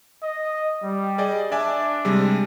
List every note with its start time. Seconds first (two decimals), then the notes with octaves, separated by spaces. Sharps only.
0.23 D#5
0.83 G3
1.18 G#4 D5 D#5
1.52 D4 D5 E5 G#5
2.05 C3 G3 G#3